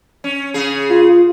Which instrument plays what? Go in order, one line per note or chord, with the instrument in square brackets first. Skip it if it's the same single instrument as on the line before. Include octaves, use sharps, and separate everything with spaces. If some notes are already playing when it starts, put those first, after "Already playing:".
[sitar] C#4
C#3 G#4
[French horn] F4